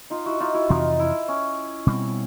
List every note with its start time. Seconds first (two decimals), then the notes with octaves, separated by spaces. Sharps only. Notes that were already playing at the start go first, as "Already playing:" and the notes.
0.10 D#4 F4
0.26 E4 F#4
0.40 D#4 F4
0.54 E4 F#4
0.69 F2 C3 E3 D#4 F4
0.99 E4
1.28 C#4
1.87 B2 G3 C4